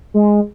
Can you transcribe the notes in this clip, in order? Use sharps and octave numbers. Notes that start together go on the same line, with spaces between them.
G#3